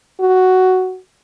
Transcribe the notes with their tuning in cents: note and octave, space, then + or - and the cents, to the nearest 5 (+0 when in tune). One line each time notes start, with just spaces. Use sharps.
F#4 +5